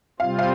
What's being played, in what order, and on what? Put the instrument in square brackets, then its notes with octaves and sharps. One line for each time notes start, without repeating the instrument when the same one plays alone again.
[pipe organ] C3 G3 C4 F4 [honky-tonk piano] F5
[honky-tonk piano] F5